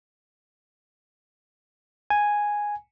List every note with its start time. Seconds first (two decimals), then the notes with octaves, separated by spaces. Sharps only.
2.10 G#5